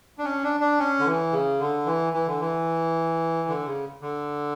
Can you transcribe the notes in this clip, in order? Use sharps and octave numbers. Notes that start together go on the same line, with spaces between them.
D4
C#4
D4
D4
C#4
D3
E3
C#3
D3
E3
E3
D3
E3
D3
C#3
D3